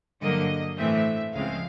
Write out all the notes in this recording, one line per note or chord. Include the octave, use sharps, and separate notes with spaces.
G2 D3 F#3 A#3 D#5
A2 E3 A3 C4 E5
C#2 C#3 F3 G#3 C4 F5